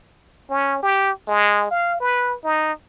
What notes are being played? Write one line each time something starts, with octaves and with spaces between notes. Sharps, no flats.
C#4
G4
G#3
F5
B4
D#4